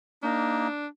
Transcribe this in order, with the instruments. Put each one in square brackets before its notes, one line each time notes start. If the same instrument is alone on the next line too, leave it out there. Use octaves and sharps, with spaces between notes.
[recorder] A#3 [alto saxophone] D4 [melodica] D#4